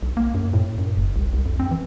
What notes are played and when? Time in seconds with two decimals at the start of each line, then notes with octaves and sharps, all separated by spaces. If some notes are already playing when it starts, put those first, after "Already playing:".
0.03 B1
0.17 A#3
0.34 F#2
0.53 A2
0.78 F#2
0.97 F#1
1.16 C2
1.33 C2
1.46 F2
1.60 C4
1.71 E3